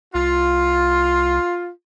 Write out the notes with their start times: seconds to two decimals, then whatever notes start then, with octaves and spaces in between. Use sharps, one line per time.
0.15 C2 F4